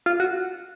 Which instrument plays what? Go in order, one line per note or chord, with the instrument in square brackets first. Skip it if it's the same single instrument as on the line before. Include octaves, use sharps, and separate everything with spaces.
[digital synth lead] F4
F#4